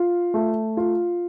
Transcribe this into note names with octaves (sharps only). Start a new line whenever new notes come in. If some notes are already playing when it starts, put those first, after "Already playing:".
Already playing: F4
A3
F4